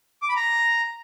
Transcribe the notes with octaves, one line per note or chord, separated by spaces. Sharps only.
D6
B5
A#5